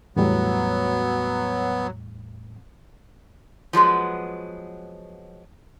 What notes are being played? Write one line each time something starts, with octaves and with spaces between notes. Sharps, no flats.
E2 A2 F#3 G3 B3
F3 F#3 G#3 B3